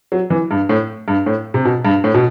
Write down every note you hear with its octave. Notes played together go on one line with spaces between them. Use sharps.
F#3
E3
G2
A2
G2
A2
C3
B2
G2
A2
B2